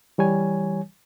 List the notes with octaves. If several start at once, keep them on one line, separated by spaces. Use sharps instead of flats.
E3 G3 C#5 G#5